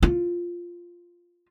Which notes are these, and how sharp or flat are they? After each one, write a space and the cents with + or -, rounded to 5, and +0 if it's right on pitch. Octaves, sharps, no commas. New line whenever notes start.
F4 +0